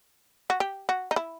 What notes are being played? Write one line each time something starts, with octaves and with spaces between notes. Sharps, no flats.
F#4
G4
F#4
D#4
E4